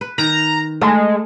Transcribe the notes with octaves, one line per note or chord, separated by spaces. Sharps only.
B4
D#3 A#5
G#3 A3